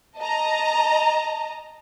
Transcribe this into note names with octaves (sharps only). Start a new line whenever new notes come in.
D#5 A5 A#5